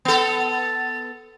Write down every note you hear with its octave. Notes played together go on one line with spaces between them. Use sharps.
B3 A4